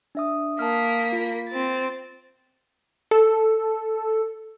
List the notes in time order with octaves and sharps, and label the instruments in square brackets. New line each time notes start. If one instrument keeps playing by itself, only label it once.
[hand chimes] D4 E5 D#6
[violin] A#3 B6 [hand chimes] A5 D#6 F6
[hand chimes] F4
[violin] C4 A6
[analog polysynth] A4